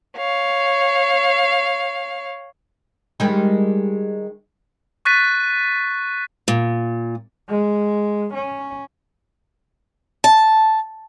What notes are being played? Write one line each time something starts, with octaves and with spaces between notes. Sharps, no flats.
C#5 F5
D#3 G3 G#3
C#6 F#6 A6 B6 D#7
A#2
G#3
C#4
A5